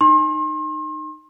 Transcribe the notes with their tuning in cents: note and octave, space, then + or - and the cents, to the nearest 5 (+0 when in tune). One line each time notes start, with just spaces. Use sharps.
D#4 -20 C6 +40